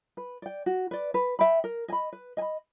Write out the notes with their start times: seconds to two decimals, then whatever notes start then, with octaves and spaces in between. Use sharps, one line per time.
0.17 B4
0.42 D5 G5
0.66 F#4
0.91 B4 D5
1.14 B4
1.39 E5 G5 B5
1.64 A#4
1.88 D#5 G#5
1.92 B5
2.13 B4
2.37 D#5 G#5
2.42 B5